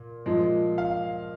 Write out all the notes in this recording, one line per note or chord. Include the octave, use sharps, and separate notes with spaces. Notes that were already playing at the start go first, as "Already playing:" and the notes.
Already playing: A#2
A#2 F3 G#3
F5